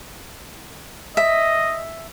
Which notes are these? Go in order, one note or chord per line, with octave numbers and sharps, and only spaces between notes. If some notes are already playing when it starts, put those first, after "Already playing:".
D#5 E5